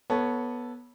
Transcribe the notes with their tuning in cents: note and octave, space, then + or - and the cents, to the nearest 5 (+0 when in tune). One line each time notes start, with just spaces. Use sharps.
B3 -15 A4 +0 C#5 +0